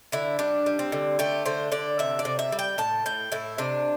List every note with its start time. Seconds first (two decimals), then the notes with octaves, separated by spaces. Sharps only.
0.12 D3 E4
0.39 G3 D4
0.66 G3
0.79 C4
0.92 D3
1.19 A3 G4
1.46 D3 C5
1.72 D3 D5
1.99 C3 E5
2.19 D5
2.25 C3
2.39 E5
2.52 G3
2.59 G5
2.78 A2 A5
3.06 A2 G5
3.32 A2 E4
3.58 C3 D4